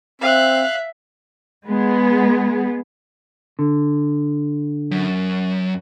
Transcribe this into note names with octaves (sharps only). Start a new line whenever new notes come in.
C4 E5 F5 F#6
G#3 B3 G#4
D3
F#2